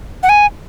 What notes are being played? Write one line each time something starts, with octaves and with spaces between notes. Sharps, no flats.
F#5
G#5